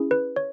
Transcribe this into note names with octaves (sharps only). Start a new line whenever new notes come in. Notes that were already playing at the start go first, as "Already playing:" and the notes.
Already playing: C#4 E4 G#4
B4
C#5